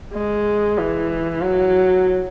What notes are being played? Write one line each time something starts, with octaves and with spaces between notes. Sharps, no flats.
G#3
E3
F#3